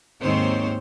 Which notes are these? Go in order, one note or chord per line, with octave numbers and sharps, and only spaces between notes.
D#2 G#2 D#3 C4 C5 C#5